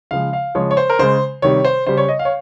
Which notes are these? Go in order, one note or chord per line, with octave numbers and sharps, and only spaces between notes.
C#3 F3 G#3 F5
F5
C#3 F3 G#3 C#5
C#5
C5
A#4
C#3 G#3 C5
C3 D#3 G3 C#5
C5
C#3 G3 C5
C#5
D#5
F5
C#5